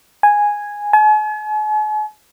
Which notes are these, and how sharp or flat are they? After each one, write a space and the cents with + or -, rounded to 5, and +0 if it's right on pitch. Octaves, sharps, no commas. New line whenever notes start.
G#5 -5
G#5 +45